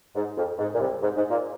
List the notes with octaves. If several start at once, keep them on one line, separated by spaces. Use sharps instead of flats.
G#2
F2
G#2
A#2
C2 C3
G#2
G#2
A#2